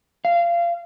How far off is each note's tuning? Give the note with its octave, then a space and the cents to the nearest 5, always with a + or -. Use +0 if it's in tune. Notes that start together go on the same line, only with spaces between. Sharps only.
F5 -25